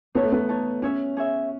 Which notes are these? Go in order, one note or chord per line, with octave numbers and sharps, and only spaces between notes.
B3 D#4 A4 C#5
A3
B3
D#4 A4 C#5
C#4 G#4 C#5 E5
G#4 C#5 E5